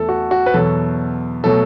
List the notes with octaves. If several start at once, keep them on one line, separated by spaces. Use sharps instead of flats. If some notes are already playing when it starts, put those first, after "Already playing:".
Already playing: E2 E3 A3 A4 A5
F#4
F#4
B4
E2 B2 F#3 A4
B2 F#3 A3 A4